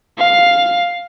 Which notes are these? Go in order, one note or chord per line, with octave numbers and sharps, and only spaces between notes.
F5